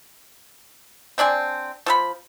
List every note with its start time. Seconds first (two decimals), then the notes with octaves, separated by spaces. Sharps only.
1.18 C4 D4 D5 G#5
1.86 F3 A4 B5